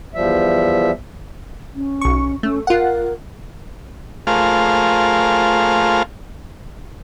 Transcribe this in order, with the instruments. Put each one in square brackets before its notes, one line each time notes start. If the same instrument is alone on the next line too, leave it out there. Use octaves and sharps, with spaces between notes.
[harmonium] E2 F3 G3 E5
[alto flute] C#4
[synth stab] B1 C#6
[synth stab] A3 [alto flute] C#4
[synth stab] F4 F#5 [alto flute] A#4
[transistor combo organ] A3 F4 G#4 A#4 C5 F5